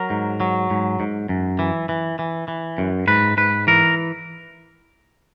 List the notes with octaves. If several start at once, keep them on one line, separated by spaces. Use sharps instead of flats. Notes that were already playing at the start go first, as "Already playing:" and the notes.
Already playing: F#3 A#4
G#2
F#3
G#2
G#2
F#2
E3
E3
E3
E3
F#2
G#2 B4
G#2 B4
E3 A#4